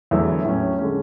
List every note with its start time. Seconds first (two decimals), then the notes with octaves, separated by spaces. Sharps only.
0.11 E2 D3 F#3 A3 E4
0.45 A2 F#3 C#4
0.79 D3 G#3 C#4